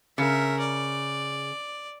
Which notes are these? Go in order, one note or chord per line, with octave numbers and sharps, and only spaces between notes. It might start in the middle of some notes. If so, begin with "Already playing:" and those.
C#3 A#4 E5
D5